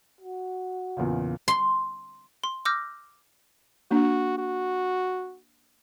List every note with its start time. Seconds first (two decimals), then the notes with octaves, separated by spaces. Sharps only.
0.21 F#4
0.97 E2 A#2 C#3
1.48 C6
2.44 C6
2.65 D6 E6 F6 G6 A#6
3.91 A#3 D4 F#4
4.38 F#4